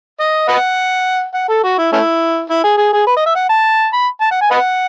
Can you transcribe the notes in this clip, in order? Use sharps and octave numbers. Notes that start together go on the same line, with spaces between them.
D#5
B4 D#5 F#5
F#5
A4
F#4
E4
A3 C#4 E4
E4
G#4
G#4
G#4
B4
D#5
E5
F#5
A5
B5
A5
F#5
G#5
B4 D#5 F#5